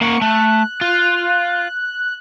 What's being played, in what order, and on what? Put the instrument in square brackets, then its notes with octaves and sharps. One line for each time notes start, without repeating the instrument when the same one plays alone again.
[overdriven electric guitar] A#3 F#5 [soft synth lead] C#6
[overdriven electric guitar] A3 [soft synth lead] F#6
[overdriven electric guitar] F4